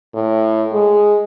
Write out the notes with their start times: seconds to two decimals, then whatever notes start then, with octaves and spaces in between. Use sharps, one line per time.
0.14 A2
0.73 G#3